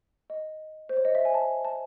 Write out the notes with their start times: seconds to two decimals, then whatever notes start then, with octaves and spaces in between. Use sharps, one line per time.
0.30 D#5
0.89 C5
0.97 C#5
1.05 D#5
1.15 E5
1.25 G#5
1.34 A5
1.65 A5